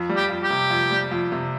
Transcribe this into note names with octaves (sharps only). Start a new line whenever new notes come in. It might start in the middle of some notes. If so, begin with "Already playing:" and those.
Already playing: F2
G3
G4
F2
G4
C3
F2
G3
F2
C3